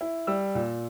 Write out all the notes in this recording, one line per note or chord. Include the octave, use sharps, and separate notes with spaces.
E4
G3 E6
A#2